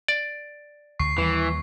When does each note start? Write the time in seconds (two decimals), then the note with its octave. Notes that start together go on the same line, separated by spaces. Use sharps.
0.08 D5
0.99 D2 C#6 C7
1.18 D#2 E3 G3